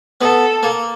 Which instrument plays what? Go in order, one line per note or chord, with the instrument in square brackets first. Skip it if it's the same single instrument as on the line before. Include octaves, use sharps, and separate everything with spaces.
[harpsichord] B3 [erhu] A4
[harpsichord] A#3